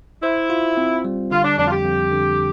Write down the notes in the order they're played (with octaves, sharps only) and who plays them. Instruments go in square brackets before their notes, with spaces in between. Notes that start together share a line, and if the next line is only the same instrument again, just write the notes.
[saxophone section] E4 [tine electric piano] C5
[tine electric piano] F4
C4
G3
[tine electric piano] D3 [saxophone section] F4
[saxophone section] D4
[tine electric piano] F2 [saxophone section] D4
[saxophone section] F4
G4
[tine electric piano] F2
D3